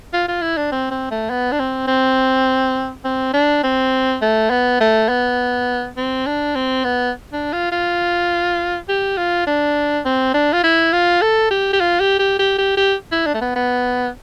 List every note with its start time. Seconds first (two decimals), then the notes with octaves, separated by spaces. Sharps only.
0.13 F4
0.28 F4
0.42 E4
0.57 D4
0.72 C4
0.91 C4
1.11 A3
1.30 B3
1.52 D4
1.59 C4
1.87 C4
3.04 C4
3.33 D4
3.64 C4
4.22 A3
4.50 B3
4.81 A3
5.09 B3
5.97 C4
6.26 D4
6.55 C4
6.84 B3
7.33 D4
7.53 F4
7.72 F4
8.89 G4
9.17 F4
9.47 D4
10.05 C4
10.34 D4
10.53 F4
10.64 E4
10.93 F4
11.22 A4
11.51 G4
11.73 G4
11.80 F4
12.00 G4
12.19 G4
12.39 G4
12.58 G4
12.77 G4
13.12 E4
13.26 D4
13.34 A3
13.41 B3
13.56 B3